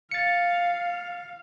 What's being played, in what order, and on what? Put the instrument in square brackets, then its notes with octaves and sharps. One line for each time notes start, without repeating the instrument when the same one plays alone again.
[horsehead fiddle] F5 [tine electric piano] A6 C#7